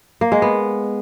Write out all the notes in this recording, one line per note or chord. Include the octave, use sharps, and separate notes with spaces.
A#3
G#3
B3